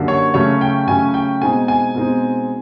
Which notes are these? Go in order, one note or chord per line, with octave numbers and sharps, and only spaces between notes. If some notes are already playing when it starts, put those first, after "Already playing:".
Already playing: F#2 D3 G3 A#3
C#5
C#3 F#3 A3 C#4 C#5
G5
C#3 F#3 A3 C#4 G#5
G5
B2 G#3 C4 D#4 G#5
G#5
B2 G#3 C4 D#4